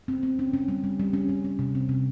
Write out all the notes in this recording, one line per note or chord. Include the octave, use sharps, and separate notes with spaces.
C4
C4
C#4
C#4
G3
G3
G3
C#4
G3
C#4
C3
C4
C3